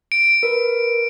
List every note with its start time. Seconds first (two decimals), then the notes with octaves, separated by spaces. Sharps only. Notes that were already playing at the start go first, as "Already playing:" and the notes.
0.12 D7
0.43 A#4 B4